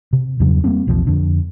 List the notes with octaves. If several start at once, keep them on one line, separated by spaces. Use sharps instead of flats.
C3
E2 G2 C#3 F#3
G3 A#3 C4 D4
A#1 E2 C3 F3
F2 D3